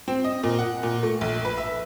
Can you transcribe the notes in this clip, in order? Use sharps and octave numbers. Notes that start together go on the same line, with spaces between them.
C4
D#5
A#2
F#5
A#2
A3
A#1
B4
E5